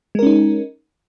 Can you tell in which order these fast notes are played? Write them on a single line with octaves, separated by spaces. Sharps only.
G#3 A#4 C#4 D#4